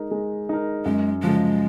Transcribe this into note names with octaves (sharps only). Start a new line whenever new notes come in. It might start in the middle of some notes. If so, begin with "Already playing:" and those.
Already playing: G#3 D#4 A#4
G#3
D#4 A#4
F#2 G#3
C#3 F3 G#3